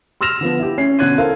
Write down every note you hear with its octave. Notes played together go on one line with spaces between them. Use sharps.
C6 E6 F6 A#6 E7 F7
D3 F3 B3
E4 G4
C#4 C7
B2 D3 C#4 F#6 G#6 D#7
E4 A4 A#4 C5 F5